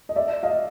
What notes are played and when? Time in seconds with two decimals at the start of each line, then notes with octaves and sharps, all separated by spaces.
0.09 D#5
0.16 D5 E5
0.43 D#5 F5